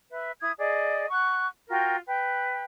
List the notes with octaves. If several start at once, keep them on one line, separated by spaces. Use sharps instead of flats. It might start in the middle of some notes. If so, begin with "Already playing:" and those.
B4 E5
E4 D#6 G#6
G#4 D5 D#5
F#5 C#6 F#6
F4 F#4 A#4 G5
B4 G5